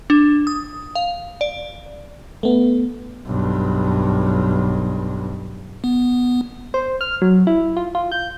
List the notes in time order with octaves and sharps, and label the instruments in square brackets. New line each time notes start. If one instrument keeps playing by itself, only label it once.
[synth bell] D4
D#6
F5
D5
[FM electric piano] A3 B3
[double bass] B1 G2
[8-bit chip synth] B3
[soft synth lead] C5
F6
F#3
E4
F4
F4
G6